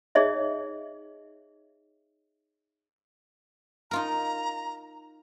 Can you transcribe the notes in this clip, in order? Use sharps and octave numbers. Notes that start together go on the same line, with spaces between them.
D#4 G#4 C#5 D#5 E5
D#4 F4 A#4 A#5